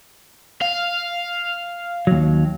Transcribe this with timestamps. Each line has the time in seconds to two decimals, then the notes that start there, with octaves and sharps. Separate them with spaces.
0.62 F5
2.07 D#2 F#3